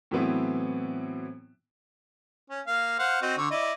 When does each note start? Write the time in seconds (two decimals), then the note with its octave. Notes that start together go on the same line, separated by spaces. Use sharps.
0.11 A2 E3 F#3 B3 C4 E4
2.50 C#4
2.67 A#3 F5
2.99 C5 F5 F#5
3.22 C4 F#4 D#5
3.38 D3 C#6
3.51 E4 D5 D#5